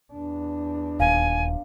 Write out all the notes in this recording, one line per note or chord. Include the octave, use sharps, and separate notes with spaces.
E2 D4
D#1 F5 G#5